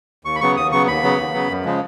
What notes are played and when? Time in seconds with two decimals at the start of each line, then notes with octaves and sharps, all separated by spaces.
0.25 D#2 C#6
0.35 B5
0.41 C#3 F#3 B3 C#6
0.57 D#2 D#6
0.71 C#3 F#3 B3 C#6
0.87 D#2 B5
1.03 C#3 F#3 B3
1.18 D#2
1.33 C#3 F#3 B3
1.49 F#2
1.65 C#3 F3 G#3